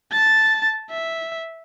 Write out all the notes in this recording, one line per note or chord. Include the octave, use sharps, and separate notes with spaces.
A5 A6
E5